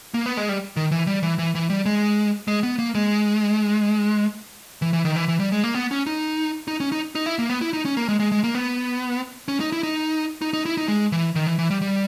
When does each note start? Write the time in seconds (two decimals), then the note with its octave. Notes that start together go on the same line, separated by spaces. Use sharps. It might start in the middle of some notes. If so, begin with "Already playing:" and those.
0.14 A#3
0.26 B3
0.37 G#3
0.49 G3
0.77 D#3
0.91 E3
1.07 G3
1.23 E3
1.39 E3
1.55 E3
1.70 G3
1.86 G#3
2.48 G#3
2.63 B3
2.79 A#3
2.95 G#3
4.82 E3
4.93 E3
5.05 D#3
5.16 E3
5.28 E3
5.40 G3
5.52 G#3
5.64 A#3
5.75 B3
5.91 C#4
6.06 D#4
6.68 D#4
6.80 C#4
6.92 D#4
7.15 D#4
7.26 E4
7.39 A#3
7.50 B3
7.61 E4
7.73 D#4
7.85 C#4
7.97 A#3
8.08 G#3
8.20 G#3
8.32 G#3
8.44 A#3
8.55 B3
9.48 C#4
9.60 D#4
9.72 E4
9.83 D#4
10.42 D#4
10.53 D#4
10.65 E4
10.77 D#4
10.88 G#3
11.12 E3
11.35 D#3
11.47 E3
11.59 E3
11.70 G3
11.82 G3